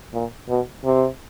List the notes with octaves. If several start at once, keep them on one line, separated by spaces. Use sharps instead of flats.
A#2
B2
C3